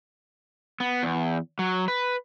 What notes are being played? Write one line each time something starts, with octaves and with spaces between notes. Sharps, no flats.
B3
E2
F#3
B4